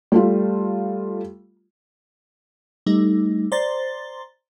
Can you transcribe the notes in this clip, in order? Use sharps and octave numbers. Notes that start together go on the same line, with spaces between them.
G3 A3 F4
G3 A3 D#4
C5 D5 A#5 C6 A6